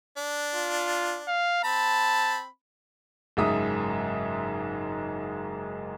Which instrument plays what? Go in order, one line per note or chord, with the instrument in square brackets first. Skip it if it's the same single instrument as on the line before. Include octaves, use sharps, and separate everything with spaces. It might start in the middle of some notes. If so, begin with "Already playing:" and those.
[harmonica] D4
[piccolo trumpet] F4
F5
[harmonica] C4 B5 [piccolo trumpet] A5
[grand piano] F#1 G#2 G#3 E5 D#6